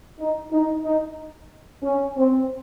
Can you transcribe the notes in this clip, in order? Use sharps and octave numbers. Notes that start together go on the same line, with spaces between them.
D#4
D#4
D#4
C#4
C4